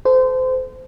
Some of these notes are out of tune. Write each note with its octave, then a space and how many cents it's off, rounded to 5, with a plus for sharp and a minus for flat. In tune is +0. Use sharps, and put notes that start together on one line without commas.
A4 -20 C5 -25